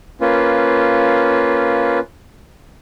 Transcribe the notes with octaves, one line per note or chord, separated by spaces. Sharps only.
A#3 C#4 F4 B4